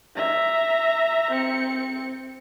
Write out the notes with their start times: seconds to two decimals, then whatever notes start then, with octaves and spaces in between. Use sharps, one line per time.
0.16 E5 A#5
1.31 C4 C#7